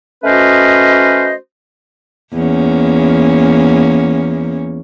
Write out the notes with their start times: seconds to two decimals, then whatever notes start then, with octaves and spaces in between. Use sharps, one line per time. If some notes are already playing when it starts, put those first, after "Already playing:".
0.24 A3 C#4 F#4 B4 C5 D#5
2.33 E2 A#3 C#4